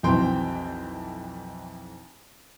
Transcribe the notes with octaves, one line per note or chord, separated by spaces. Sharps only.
B1 F2 E3 C4 G5 C6